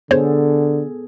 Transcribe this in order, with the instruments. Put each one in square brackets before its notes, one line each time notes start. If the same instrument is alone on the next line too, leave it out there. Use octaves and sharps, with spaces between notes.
[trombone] D3 [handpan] B3 G#4 A4 [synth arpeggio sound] C5 C#5